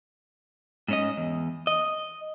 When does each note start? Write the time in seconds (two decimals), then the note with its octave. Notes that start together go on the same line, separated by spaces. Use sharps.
0.88 G#2 C#4 D#5
1.17 E2
1.67 D#5